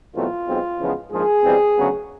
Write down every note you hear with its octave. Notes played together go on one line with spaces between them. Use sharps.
E2 B2 F#3 A3 C4 F4
B1 B2 G#3 C4
E2 C#3 F3 G#3 B3
A#1 G#2 F3 A#3 G#4
E2 B2 G3 C4
D2 C#3 F#3 B3